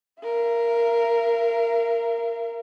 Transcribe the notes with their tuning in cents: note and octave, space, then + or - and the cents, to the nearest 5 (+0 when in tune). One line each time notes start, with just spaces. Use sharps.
A#4 +0 F5 -45